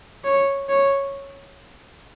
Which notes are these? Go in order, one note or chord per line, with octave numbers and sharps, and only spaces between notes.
C#5
C#5